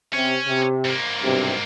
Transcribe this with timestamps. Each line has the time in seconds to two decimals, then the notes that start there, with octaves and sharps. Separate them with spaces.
0.13 C3 C#4
0.45 C3
0.85 G#2 A#3
1.22 B1 G2 C3